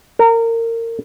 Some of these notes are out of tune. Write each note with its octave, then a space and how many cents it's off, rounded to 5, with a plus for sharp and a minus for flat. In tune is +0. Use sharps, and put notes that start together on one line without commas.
A#4 -25